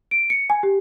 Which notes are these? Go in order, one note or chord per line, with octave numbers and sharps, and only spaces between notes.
D7
C#7
G#5
G4